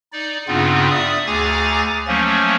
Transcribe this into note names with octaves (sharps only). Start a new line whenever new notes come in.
D#4 D5
G2 C#3 B3 C4 D#4 F4
D5 E5 D#6
D2 G#4 G#5 A#5 D6 A6
F3 F#3 A3 A#3 C#4